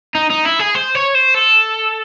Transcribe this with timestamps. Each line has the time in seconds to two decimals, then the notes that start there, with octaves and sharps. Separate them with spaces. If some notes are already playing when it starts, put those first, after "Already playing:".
0.15 D#4
0.30 D#4
0.45 E4
0.59 G#4
0.75 C5
0.95 C#5
1.15 C5
1.34 A4